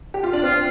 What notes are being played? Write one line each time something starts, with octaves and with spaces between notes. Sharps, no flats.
G4
F4
D4
C4 F4